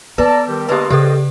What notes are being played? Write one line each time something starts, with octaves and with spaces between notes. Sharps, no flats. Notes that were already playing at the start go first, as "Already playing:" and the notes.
B3 A4 B4 D5 A#5
D#3 G3 G4
D3 G#3 A#3 G4 B4 D5 D#5
C#3 G3 G4 A4 C5 D5 D#5